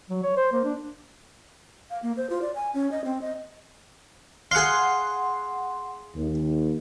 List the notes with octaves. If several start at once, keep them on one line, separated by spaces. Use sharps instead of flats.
F#3
C#5
C5
A#3
D4
F5
A#3
C5
F4
D5
G#5
C#4
D#5
C4
D#5
G#4 F5 F#5 C6
D#2